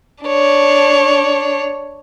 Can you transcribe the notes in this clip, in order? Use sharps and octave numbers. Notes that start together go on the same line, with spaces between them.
D4 C#5